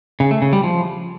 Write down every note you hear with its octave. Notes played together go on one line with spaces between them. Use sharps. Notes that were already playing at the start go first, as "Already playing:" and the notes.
C#3
A3
C#3
G3
F3